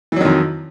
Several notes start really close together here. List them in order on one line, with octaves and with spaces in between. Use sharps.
E3 F#3 D#3 F2